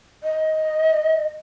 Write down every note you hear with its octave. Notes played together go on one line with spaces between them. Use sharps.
D#5